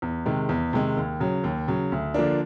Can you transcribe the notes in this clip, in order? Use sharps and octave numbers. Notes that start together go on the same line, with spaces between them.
E2
C3 D#3 G#3
E2
C3 D#3 G#3
D#2
C#3 F#3
D#2
C#3 F#3
D2
D3 F3 A#3 D4